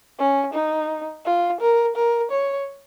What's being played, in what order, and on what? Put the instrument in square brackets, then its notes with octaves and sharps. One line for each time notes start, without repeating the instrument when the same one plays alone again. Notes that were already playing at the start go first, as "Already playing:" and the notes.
[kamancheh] C#4
D#4
F4
A#4
A#4
C#5